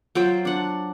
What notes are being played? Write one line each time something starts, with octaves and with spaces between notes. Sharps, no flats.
F#3 F4 C5 G5
D4 F#5